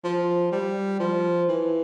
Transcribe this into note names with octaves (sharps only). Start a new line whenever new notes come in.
F3
G3
F3
E3